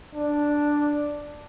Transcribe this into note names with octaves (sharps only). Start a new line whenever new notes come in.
D4